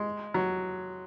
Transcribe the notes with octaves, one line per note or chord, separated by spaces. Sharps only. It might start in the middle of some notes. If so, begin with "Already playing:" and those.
Already playing: G#3
F#3